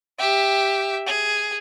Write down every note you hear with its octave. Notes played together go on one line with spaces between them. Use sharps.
G4 E5
G#4